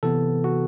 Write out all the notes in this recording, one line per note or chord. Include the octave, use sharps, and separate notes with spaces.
C3 E3 B3 A4
F#4